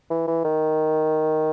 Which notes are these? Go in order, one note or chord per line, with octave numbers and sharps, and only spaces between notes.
E3
E3
D#3